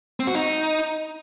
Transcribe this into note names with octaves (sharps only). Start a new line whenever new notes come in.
C4
F#4
D#4